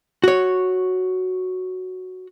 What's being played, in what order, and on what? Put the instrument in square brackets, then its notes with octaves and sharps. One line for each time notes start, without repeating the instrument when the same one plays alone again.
[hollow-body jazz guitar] F#4 C#5